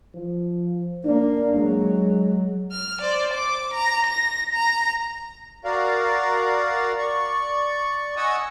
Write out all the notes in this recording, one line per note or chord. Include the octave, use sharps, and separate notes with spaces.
F3
A#3 D4
F#3 G#3
F6
C5 D5
D6
A#5
A#6
A#5
F#4 A#4 D5 F5
D5 C#6
D#5 F#5 G#5 C#6 D#6 E6